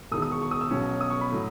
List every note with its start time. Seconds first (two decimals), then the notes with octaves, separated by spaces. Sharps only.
0.12 E1 E2 D#3 D#6
0.22 D#6
0.32 C#6
0.42 C#6
0.51 D#6
0.61 E6
0.71 B1 B2 F#3 C#4
1.01 D#6
1.10 C#6
1.21 B5
1.32 A2 F#3